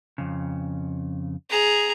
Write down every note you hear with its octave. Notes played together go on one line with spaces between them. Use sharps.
F2 C#3
G#4 A#5